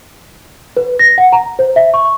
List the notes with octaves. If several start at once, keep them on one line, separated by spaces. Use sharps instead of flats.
B4
A#6
F#5
A#5
C5
E5
C#6